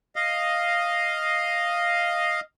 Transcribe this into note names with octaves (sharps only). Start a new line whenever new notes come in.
D#5 F5